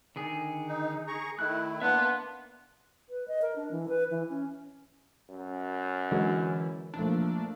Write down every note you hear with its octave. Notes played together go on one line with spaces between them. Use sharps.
D3 D#3 G#4
D#4
G#4 A#5 C#6
D#3 A3 E4 F#6
A#3 B3 D4 E5 C6 F#6
B4
D#5
A#4
D4
E3
B4
E3
C#4
F#2
D3 E3 F#3 G#3
F3 A3 A#3 D4